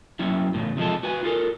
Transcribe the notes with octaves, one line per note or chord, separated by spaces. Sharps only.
F#3 C#4 E4
A2 C#3
C3 F3 G#3 A4
F#4 B4 G#5
F4 F#4 A4 A#4